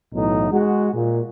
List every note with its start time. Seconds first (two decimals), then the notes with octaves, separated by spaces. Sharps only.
0.14 B1 A2 E3 D#4
0.51 G#3 F#4
0.94 A#2